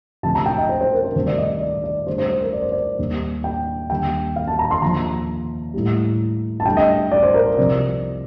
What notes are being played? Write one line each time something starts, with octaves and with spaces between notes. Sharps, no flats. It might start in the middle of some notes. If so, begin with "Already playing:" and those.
D2 C3 F3 A5
A#5
G5
D#5
C5
C5
A#4
C5
D2 C3 D#3 G3 C5
D5
D#5
D#5
D5
D5
D2 D3 G3 C5
C5
C5
A#4
D5
C5
D5
D#2 D#3 G3
G5
D#2 D3 G3 G5
F5
A5
A#5
C6
D#2 D3 F3 A#5
A2 G3
A5
D2 D3 G3 G5
D#5
D5
C5
A#4
C5
C2 C3 F3 D5